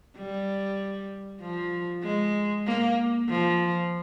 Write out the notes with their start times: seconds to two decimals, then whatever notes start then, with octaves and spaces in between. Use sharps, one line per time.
0.17 G3
1.42 F3
2.04 G#3
2.67 A#3
3.29 F3